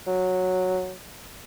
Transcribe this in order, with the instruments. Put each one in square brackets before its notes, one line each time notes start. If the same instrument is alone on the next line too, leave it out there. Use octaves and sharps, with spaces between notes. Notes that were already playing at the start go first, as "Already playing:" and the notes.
[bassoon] F#3